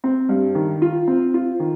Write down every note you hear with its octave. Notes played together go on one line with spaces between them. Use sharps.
C4
G2
D#3
F4
C4
F4
D#3